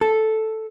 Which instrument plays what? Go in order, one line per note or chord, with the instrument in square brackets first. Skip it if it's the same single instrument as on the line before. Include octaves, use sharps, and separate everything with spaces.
[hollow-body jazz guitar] A4